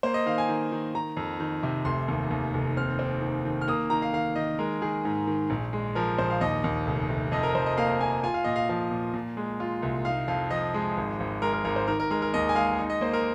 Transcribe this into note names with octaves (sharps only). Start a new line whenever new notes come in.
A#3 C5
D#5
D#3 F5
G#5
D#3
D#3
D#3 A#5
F2
D#3
C3
F1 C6
D#2
D#2
F1
C4 F6
C4
D#3
D#3
F6
A#3 D#6
D#3 A#5
F5
D#3 F5
D#3 D#5
G#3 A#4
D#3 G#4
G#2
D#3
A#1
G#3
F3 A#4
A#1 C5
F5
D#2 D#5
D#2
F1
F1
F2 D#5
A#4
F2 C5
D#5
A#3 F5
A#3 G#5
F4 G#5
F5
A#2 D#5
F5
F3 F5
A#2
A#2
G#3
F4
C2
D#4 F5
F2 F5
F3 D#5
G#3
G#1
G#1
G#3 A#4
A#4
G#1 A#4
C5
D#3 A#4
A#4
G#3 A#4
A#4
D#2 D#5
G#5
G#3 F5
D#4
D#5
A#3 C5
A#4